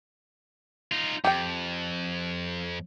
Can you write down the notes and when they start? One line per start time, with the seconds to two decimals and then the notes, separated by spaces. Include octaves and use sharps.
0.92 D#4 F4
1.25 F2 G4 G5